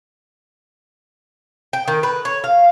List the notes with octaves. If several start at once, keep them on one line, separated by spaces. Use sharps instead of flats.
G5
D#3
B4
C#5
F5